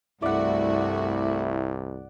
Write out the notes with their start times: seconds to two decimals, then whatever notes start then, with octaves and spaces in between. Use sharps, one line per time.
0.22 C2 G2 A3 E4 F#4 D5 F#5